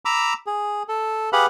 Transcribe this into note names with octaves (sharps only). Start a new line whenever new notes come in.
A#5 B5 D6 E6
G#4
A4
G4 G#4 B4 F5 F#5 B5